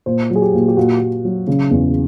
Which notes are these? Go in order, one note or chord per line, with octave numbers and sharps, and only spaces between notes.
A#2 C5
F#3
G#4
G4
A#2
G4
A#2 F#4
A#2
F#3
C#3
E2